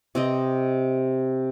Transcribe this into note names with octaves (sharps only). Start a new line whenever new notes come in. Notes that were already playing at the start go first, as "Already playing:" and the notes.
C3 C4 D#5